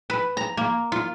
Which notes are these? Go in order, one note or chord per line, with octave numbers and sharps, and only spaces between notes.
B4
A#5
A#3
F4